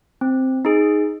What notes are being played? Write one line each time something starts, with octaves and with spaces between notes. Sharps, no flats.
C4
D#4 G#4